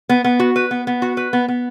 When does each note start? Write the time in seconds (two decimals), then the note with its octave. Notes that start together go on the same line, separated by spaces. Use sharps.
0.09 B3
0.24 B3
0.40 F#4
0.56 B4
0.71 B3
0.87 B3
1.02 F#4
1.17 B4
1.33 B3
1.48 B3